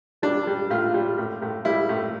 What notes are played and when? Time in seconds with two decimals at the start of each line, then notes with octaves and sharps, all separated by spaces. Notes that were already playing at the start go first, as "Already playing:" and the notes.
0.22 G3 D4
0.47 G3
0.70 A2 F4
0.94 G3
1.18 A2
1.42 A2
1.65 G3 E4
1.89 A2